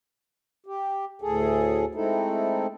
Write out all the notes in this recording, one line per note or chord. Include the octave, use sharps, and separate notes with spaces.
G4
D2 A2 G#4 A4
G#3 A3 C4 D#4 E4 A4